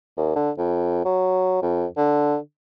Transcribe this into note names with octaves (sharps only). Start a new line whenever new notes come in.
D#2
D3
F2
F#3
F2
D3